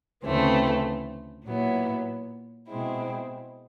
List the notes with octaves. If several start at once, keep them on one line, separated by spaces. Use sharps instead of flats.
D2 C#3 E3 A3 C4
A#2 F#3 B3 E4
B2 G#3 C4 E4